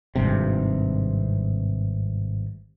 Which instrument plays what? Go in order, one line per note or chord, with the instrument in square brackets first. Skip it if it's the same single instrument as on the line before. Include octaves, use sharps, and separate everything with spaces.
[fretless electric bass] G#1 G2 C3